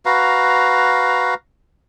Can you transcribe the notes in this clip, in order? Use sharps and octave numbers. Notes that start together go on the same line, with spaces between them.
F#4 B4 F5 A#5